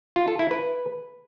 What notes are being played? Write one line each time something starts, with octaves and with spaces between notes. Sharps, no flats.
F4
A4
E4
B4